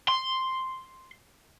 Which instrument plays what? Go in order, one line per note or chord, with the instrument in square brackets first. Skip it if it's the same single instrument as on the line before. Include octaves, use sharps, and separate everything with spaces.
[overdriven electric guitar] C6